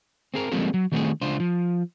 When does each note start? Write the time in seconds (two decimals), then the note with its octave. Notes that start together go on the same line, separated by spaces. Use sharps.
0.34 C4 G#4 A#4
0.51 F3 G3 G#3 A#3 C4 A4
0.74 F#3
0.92 D#3 G3 A3 C4 F#4 G#4
1.21 C#2 D4 F4 C5
1.40 F3